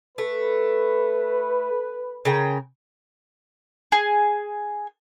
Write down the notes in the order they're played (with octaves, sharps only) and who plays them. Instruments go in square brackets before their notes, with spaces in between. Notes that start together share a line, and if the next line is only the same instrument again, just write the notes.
[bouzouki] A3 [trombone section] B4
[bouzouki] C#3 A#4 G5
[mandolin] G#4